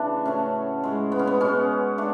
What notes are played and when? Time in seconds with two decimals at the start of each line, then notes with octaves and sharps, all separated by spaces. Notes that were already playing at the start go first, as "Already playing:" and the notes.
Already playing: C#3 E3 A3 D4
0.25 A2 F#3 A3 C#4
0.84 A2 G#3
1.12 B3
1.19 C#4
1.27 B3
1.40 B2 G#3 C#4
1.98 A3 D4